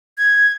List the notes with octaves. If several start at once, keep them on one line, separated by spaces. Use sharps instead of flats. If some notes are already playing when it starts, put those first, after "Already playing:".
G#6